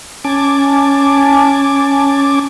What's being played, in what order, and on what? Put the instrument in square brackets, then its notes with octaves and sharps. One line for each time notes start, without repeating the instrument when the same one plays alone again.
[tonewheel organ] C#4 G#5 A5 D6